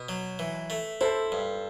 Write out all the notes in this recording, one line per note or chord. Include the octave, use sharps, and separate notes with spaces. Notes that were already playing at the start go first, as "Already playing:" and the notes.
Already playing: B2
F#3
E3
A3
E4 A4 C5
G2